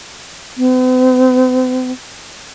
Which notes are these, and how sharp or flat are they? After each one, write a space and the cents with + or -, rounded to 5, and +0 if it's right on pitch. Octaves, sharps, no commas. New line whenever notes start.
C4 -45